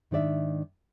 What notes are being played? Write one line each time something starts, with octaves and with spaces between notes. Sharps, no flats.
G#2 D#3 D4 D5 E5